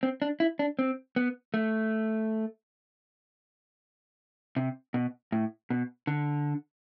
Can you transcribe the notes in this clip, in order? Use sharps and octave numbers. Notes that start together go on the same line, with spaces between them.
C4
D4
E4
D4
C4
B3
A3
C3
B2
A2
B2
D3